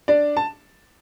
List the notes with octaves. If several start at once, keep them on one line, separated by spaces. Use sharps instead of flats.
D4 D5
A5